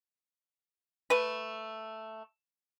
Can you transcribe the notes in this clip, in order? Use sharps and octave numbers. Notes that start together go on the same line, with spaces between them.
A3 B4